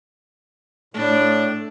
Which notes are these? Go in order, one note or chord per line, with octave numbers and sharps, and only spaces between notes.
A2 A3 D4